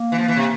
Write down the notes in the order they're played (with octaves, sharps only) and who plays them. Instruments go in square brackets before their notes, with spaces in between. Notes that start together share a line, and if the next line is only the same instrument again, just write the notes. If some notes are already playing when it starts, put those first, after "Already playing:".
Already playing: [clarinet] A#3
[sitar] E3
F3
E3
C3